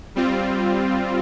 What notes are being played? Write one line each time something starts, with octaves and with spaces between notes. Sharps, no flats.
G3 C4 F4